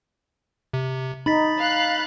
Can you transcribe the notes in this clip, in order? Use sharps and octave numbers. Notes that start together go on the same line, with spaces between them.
C3
D#4 B5 A6 B6
F5 F#6